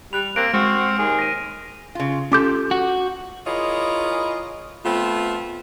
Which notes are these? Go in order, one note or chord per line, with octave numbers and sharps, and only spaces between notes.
G3 B5 F#6 F7
A#3 C4 F#6 D7
G#3 C4 F#4 F6 C7
D#2 G#4
A#6 D#7
C#3 F4
C#4 F4 G4 A4 D6 G6
F#4
E4 F4 G#4 A#4 C#5 D#5
A3 B3 C4 F4